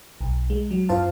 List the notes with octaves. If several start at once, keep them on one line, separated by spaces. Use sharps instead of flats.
B1
G#3
F#3
F#2 F4 C5 F5 A5